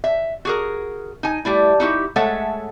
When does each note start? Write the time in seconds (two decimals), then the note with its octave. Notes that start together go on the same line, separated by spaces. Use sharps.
0.04 E5
0.45 F#4 G#4 A#4
1.23 D#4 G#5
1.45 G3 A3 E4
1.80 D#4 E4 F#4 G4
2.16 G#3 A3 A4 C#5 E5 F#5